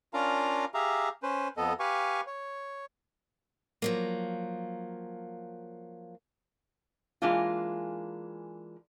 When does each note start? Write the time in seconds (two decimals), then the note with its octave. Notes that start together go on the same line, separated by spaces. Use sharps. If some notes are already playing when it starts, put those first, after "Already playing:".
0.14 C#4 D4 F4 A#4 F5 A#5
0.74 G4 G#4 E5 F5 A#5
1.23 C#4 B4 C5
1.57 F2 B3 A4 D#5
1.80 G4 B4 F5 G#5 C#6
2.27 C#5
3.82 F3 F#3 A#3
7.22 E3 G#3 A#3 D4 F4